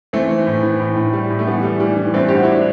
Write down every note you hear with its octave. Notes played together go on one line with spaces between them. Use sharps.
E3 A3 C4
E3
A2
E3
A2
A2
G3
A2
A3
E3 G3 B3
G3 A3
E3 G3
E3
G2 A3 C4
G2 G4
F#4
E4
D4